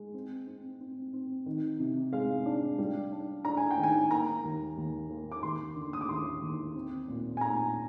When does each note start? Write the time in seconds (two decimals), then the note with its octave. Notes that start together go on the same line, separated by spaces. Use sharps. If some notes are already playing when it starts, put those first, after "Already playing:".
Already playing: G#3
0.14 C4
0.47 C4
0.80 C4
1.13 C4
1.46 D#3
1.80 C3
2.13 G#3 F5
2.46 D4
2.79 G3
3.12 D4
3.45 D4 A#5
3.57 G#5
3.71 G5
3.78 D#3
3.83 G#5
4.11 A#3 A#5
4.44 D#2
4.77 D#2
5.10 A#3
5.32 D6
5.43 D#2 C6
5.76 D3
5.93 D#6
6.01 D6
6.09 D#2 C6
6.42 D#2
6.75 C4
7.08 A#2
7.37 G#5
7.41 A#2 A#5